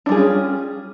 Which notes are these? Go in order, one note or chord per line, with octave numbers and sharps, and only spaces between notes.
G3 C#4 D4 F4 G#4